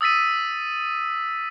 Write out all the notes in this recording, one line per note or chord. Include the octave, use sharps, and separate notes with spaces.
D#6 E6 A6 B6 D#7